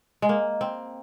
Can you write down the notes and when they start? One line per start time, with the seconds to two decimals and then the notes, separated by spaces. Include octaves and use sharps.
0.22 G#3
0.29 A#3
0.61 C4